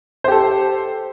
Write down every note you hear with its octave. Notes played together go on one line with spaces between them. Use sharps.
G4 A4 C5